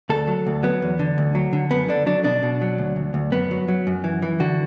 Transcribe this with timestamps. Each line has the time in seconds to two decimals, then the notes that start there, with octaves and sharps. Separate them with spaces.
0.09 D2 A4
0.27 F#3
0.46 D2
0.63 F#3 B3
0.82 E2
0.99 D3
1.18 D2
1.35 F#3
1.53 D3
1.71 F#2 B3
1.89 D3 D4
2.06 F#3 D4
2.24 B2 D4
2.43 B2
2.61 F#3
2.78 D2
2.96 D2
3.14 D2
3.32 F#2 B3
3.51 F#3
3.68 F#3
3.87 F#2
4.04 E3
4.22 E3
4.40 D3 F#4